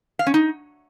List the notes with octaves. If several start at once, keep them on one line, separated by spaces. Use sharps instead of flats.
F5
C#4
D#4